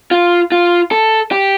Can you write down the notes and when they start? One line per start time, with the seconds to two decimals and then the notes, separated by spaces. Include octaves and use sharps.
0.11 F4
0.52 F4
0.91 A4
1.32 G4